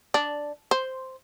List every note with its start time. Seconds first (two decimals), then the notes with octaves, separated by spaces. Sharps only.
0.14 D4
0.71 C5